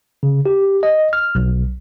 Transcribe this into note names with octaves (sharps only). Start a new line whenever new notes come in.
C#3
G4
D#5
F6
B1